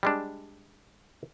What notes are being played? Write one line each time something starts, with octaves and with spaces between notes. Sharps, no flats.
G3 G#3 D4